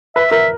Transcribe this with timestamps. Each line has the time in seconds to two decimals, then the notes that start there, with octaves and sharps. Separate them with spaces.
0.16 B4 E5
0.31 A#4 E5